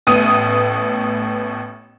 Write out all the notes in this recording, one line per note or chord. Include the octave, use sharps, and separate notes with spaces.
A1 A2 B3 D#6 D#7